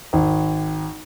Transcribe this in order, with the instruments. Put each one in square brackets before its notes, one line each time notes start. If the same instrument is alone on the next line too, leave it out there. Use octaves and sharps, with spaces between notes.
[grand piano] G#1